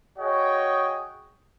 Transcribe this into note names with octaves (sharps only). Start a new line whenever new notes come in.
F#4 G#4 C#5 D#5 G5